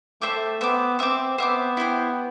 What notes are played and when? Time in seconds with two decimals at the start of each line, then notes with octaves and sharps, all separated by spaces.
0.21 A3 C5 E5 G5 D6
0.61 B3 C5 E5 G5 D6
0.99 C4 C5 E5 G5 D6
1.38 B3 C5 E5 G5 D6
1.77 E4 G4 C5 G5